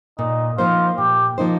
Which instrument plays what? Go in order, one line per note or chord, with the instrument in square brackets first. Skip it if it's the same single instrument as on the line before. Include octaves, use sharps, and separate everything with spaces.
[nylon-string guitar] A#2 [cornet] D#4
[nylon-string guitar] F3 A#3 D#4 C5 [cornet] F4
[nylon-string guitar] A#2 [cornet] G4
[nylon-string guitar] F3 A#3 D#4 C5